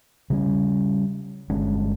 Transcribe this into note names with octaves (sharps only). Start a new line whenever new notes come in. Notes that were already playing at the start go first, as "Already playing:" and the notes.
C#3 G3 C#4
G1 G#3 C#4 D4